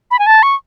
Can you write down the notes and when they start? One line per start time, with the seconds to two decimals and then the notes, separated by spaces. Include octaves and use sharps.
0.11 B5
0.19 G#5
0.27 A5
0.43 C#6